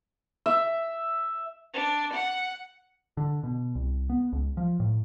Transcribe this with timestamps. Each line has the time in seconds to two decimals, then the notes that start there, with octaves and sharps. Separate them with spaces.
0.46 E5
1.74 D4
2.13 F#5
3.17 D3
3.43 B2
3.75 C2
4.09 B3
4.33 C#2
4.57 F3
4.80 A2